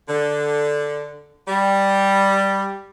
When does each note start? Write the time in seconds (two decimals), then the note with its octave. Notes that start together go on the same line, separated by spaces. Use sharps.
0.08 D3
1.48 G3